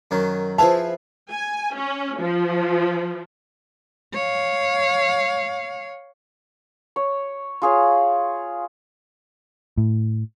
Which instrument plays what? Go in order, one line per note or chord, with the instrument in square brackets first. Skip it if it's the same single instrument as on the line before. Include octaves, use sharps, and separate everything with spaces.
[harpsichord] F#2 D#3 F#3
[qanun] F3 F5 [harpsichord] E4 G#4 B4 [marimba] A5
[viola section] G#5
C#4
F3
[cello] C#5 F5
[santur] C#5
F4 G#4 C#5
[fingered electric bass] A2